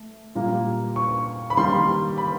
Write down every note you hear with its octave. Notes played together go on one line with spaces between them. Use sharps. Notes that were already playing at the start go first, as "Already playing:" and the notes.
Already playing: A3
A#2 G3 A#3
C#6
B5
D#3 G3 A#3 C6
B5